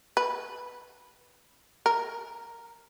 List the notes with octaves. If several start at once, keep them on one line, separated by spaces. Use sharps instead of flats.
B4
A#4